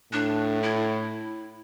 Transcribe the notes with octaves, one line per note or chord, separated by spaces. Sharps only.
A2 D4
E4